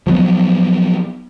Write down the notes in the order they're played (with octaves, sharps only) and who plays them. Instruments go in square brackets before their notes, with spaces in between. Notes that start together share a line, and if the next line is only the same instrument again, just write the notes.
[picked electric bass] F3 F#3 A#3 B3